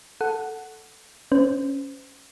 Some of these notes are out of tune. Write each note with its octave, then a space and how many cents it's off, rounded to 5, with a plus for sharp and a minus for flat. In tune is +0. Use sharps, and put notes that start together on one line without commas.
A4 +0 F#5 +0
C#4 +0 C5 -35